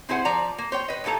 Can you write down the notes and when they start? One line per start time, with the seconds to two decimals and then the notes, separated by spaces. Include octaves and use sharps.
0.09 C4 E4 G#4 C5 F#5
0.25 F3 D5 A#5
0.58 A#3
0.72 C5 C#5 G5
0.88 B4 D#5
1.04 A2 D#3 A#3 A4 A#5